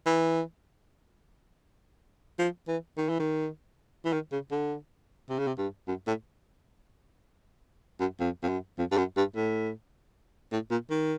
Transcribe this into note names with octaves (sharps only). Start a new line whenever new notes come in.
E3
F3
E3
D#3
E3
D#3
E3
D#3
C#3
D3
C3
C#3
C3
G2
F#2
A2
F#2
F2
F2
F#2
F2
G2
F#2
G2
A2
A2
A#2
D#3